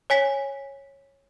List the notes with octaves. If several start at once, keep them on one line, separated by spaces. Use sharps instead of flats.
C#5 G#5 B6